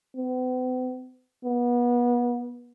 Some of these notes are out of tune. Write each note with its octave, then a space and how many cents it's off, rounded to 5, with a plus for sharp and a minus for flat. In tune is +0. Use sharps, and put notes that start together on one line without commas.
B3 +45
B3 -30